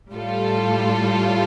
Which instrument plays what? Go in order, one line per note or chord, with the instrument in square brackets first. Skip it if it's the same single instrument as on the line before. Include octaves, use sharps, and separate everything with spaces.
[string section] A2 G3 F4 A4